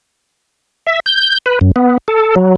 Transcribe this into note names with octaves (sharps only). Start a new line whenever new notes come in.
E5
G6
B4
F#2
B3
A4
F#3